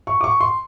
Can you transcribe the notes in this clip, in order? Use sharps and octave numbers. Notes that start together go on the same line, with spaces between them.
C#6
D6
C#6
C6